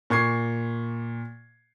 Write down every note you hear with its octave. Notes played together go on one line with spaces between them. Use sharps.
A#2 C#6 G#6 C7